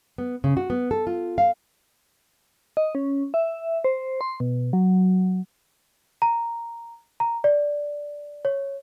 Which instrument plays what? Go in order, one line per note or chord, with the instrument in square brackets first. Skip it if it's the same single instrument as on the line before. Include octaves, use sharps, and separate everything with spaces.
[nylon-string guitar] B3
C#3
F#4
B3
A4
F4
F5
[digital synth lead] D#5
C#4
E5
C5
C6
B2
F#3
[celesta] A#5
A#5
D5
C#5